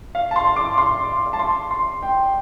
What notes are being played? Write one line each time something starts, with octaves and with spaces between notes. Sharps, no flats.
F5
A5
C6
D6
C6
A5
C6
C6
G5